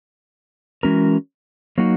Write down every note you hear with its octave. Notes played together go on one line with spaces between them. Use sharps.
E3 G#3 C#4 F#4 A#4
F#3 A#3 D#4 F#4